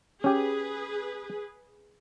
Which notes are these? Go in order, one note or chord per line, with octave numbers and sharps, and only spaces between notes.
C#4 G4 G#4 B4